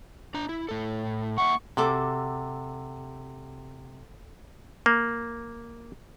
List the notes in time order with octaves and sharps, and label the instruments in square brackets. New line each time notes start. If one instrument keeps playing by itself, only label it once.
[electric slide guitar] D4 A#5
E4
A2 A4
[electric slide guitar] A#3 E5 F#5 [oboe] C#6
[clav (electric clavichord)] C3 [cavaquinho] F#4 A4 D6
[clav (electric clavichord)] A#3